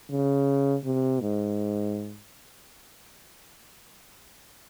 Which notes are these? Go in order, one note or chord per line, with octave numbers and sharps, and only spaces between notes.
C#3
C3
G#2